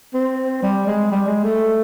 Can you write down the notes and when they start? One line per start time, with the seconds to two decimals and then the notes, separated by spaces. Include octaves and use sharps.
0.14 C4
0.63 G3
0.87 G#3
1.11 G3
1.27 G#3
1.44 A3